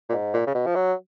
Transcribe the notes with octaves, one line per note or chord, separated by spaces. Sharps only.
A#2
G#2
A#2
C#3
B2
F3
F#3